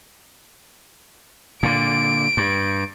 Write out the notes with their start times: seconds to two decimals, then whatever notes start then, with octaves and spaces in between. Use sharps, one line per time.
1.63 A#2 D3 D7
2.37 G2